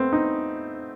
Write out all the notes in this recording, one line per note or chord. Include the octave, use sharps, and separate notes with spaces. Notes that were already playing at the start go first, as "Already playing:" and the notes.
Already playing: A3 B3 C4
D#4